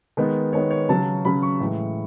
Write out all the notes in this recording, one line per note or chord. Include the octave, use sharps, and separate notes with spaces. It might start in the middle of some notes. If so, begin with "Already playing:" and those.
D#3 G#3 B3
D#3 G#3 B3 C#5
C#5
C#3 F#3 C#4 A5
C#3 F#3 C#4 B5
C#6
A2 E3 G#3